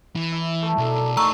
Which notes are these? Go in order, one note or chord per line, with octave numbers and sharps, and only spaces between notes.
E3
E4
A3 E4 A4
B1 D4 A4 A#4
A3 D#4 A#5 C#6 E6